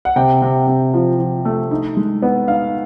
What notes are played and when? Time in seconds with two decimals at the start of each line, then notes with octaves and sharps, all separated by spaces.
0.05 F#5
0.16 C3 G5
0.42 C3
0.67 C3
0.94 F3
1.19 F3
1.45 A3
1.71 D#4
1.97 G#3
2.22 B3
2.48 D#4 F5